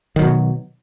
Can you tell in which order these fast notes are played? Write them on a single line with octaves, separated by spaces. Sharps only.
D#3 F#3 B2